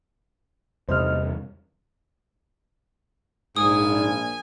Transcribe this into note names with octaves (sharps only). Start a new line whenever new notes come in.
E2 C3 G3 C5 D#5 F6
A#1 G#2 G#5 D#6